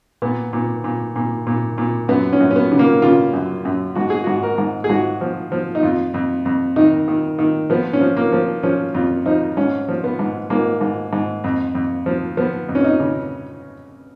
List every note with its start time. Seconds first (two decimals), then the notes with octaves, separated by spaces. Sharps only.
0.22 A#2 B3
0.53 A#2
0.84 A#2
1.16 A#2
1.47 A#2
1.78 A#2
2.09 F#2 B3
2.33 C#4
2.40 F#2
2.51 C#4
2.56 B3
2.72 C#3
2.79 A#3
3.02 C#3 F4
3.33 F#2
3.65 F#2
3.95 G#2 F#4
4.10 G#4
4.24 G#2 F#4
4.43 A#4
4.58 G#2
4.84 G#4
4.90 G#2 F#4
5.21 F3
5.52 F3
5.75 D#4
5.83 F2 F4
6.14 F2
6.45 F2
6.76 D#3 D#4
7.08 D#3
7.39 D#3
7.70 F3 B3
7.93 C#4
8.01 F3
8.17 A#3
8.32 F3
8.63 F3 C#4
8.94 F2 F4
9.26 F3 D#4
9.57 G#2 C#4
9.89 F3
10.04 B3
10.19 G#2
10.50 G#2 A#3
10.81 G#2
11.13 G#2
11.44 F2
11.75 F2
12.06 F3
12.37 F3 B3
12.69 F2
12.75 C#4
12.84 D#4
13.00 C#3